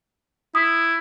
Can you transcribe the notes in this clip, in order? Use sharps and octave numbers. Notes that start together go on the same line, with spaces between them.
E4 D#6